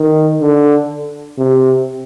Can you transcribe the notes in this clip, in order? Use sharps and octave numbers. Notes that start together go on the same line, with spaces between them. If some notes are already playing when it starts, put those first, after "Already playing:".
Already playing: D#3
D3
C3